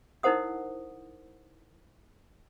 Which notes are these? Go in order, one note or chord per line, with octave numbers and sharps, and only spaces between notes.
D#4 E4 A#4 C5 F#5 D#6